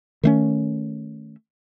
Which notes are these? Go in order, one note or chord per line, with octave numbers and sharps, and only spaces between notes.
D#3 A3 C#4